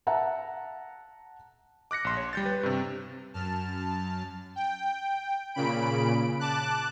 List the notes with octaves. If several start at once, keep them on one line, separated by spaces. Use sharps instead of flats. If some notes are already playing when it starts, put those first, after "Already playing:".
E5 F#5 A5 A#5
D6 F#6 A#6 C#7
A#1 C6
C#5
G3 G6 A6
B4
G2 C3
F#2 A5 F6
G5
A#2 C#3 B5 D7
A5 D6 F#6